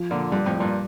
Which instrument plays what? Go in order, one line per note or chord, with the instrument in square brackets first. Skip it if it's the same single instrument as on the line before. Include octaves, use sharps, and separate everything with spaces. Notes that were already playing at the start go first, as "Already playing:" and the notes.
Already playing: [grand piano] F3
[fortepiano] A#2 D3 [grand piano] F4
[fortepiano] G2 [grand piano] G3
[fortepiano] F2 A2
[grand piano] G3
[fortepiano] G2 A#2